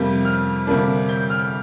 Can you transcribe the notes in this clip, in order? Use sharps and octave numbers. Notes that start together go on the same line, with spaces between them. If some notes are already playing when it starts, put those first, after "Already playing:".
Already playing: F2 C3 G3 A#3 G6
F6
D2 C3 G3 A#3 D4
G6
F6